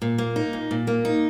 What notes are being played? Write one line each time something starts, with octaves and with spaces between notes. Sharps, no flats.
A#2
A#3
D#4
A#2
A#2
A#3
D#4